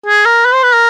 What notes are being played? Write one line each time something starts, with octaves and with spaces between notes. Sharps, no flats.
G#4
A#4
B4
C5
B4
A#4